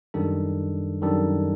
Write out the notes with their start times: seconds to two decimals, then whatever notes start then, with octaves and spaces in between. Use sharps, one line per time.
0.14 F#2 D#3 G3 D4 A4
1.02 F#2 D#3 G3 D4 A4